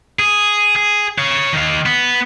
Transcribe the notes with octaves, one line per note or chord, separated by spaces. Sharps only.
G#4
G#4
C#5 F5
D#3 F5
B3